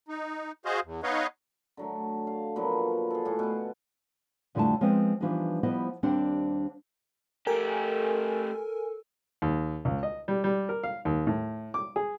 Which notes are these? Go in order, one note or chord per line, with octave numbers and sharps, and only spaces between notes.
D#4
F#4 G#4 C5 D#5 F5
E2
B3 D#4 B4 C#5 D#5 F5
D3 F#3 A3
F5
A#2 F3 F#3 B3
G#4 A4
A2 F#4 G#4
B2 A5
F2 D3 G3 A3 E4 A5
F3 G#3 B3 C4
E3 F3 G3 B3 D4 D#4
F3 G3 B3 E4 C5 D#5
D#2 G3 C4 D4 C5 F#5
A3 G4 A4 A#4 G#5
D#2
C#2
D#5
G3
G3
A#4
F5
D#2
A2
D6
G#4